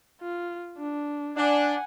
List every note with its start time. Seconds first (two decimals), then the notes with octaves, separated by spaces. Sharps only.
0.21 F4
0.78 D4
1.37 D4 F#5 G#5